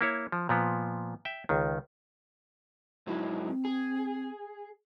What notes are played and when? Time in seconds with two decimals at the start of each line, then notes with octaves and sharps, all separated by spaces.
0.01 A#3 E4 C#5
0.32 F3
0.49 A#2 F3 B3
1.25 E5 G5
1.49 C#2 D#3
3.07 G#2 F#3 E4
3.47 C4
3.65 G#4